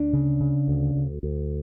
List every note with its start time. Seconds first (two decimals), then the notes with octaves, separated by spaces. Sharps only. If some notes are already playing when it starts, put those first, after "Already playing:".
Already playing: D2 D4
0.13 C#3
0.40 C#3
0.68 D2
0.95 D2
1.23 D2